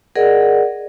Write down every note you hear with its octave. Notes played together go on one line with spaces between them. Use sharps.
G#4 A#4 D5 D#5 F#5